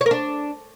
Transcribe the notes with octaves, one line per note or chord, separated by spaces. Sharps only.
C#5
A#4
D4